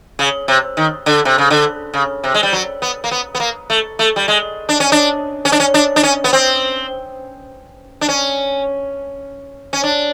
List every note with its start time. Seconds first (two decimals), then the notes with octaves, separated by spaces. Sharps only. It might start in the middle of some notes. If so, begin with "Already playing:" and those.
0.19 C#3
0.48 C3
0.77 D#3
1.06 D3
1.25 C3
1.38 C#3
1.50 D3
1.94 C#3
2.24 C3
2.34 G#3
2.43 G3
2.53 F#3
2.82 B3
3.04 A#3
3.11 B3
3.35 B3
3.40 A#3
3.70 A3
3.99 A3
4.16 G3
4.28 G#3
4.69 D4
4.80 C#4
4.92 D4
5.45 C#4
5.52 D4
5.60 C#4
5.74 D4
5.96 D4
6.03 C#4
6.24 B3
6.33 C4
8.01 D4
8.09 C#4
9.73 C#4
9.83 D4